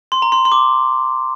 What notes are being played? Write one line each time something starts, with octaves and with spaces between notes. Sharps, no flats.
C6
A#5
C6
C6
D6